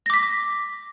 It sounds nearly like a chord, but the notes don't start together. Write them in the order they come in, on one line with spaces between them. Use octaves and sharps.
A#6 D6 B6